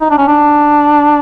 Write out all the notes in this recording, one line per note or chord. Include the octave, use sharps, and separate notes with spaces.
D#4
D4
C#4
D4